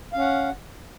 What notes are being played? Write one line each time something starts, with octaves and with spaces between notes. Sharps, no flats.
C#4 F5 F#5